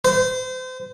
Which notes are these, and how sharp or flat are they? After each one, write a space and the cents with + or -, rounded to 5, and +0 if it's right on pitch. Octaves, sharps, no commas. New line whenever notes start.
C5 -35